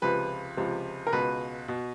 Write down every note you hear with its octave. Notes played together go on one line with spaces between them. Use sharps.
C#2 C3 F3 B4
C#2 C3 F3
A#4
C#2 B2 B4
B2